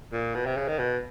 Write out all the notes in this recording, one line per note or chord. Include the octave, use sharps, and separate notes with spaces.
A#2
B2
C3
C#3
D#3
B2